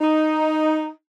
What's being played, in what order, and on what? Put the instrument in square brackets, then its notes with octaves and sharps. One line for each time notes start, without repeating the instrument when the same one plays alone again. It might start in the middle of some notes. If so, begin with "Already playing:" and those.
[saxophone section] D#4